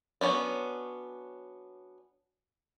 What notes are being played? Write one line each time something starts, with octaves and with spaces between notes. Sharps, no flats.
F#3 B3 C#4 D4